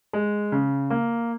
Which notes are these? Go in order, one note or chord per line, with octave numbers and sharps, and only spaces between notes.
G#3
C#3
A#3